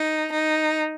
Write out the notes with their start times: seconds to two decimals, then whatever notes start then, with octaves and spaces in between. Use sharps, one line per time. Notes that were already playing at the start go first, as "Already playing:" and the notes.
Already playing: D#4
0.32 D#4